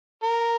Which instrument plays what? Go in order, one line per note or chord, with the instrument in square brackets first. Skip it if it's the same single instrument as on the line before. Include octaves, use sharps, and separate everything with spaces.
[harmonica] A#4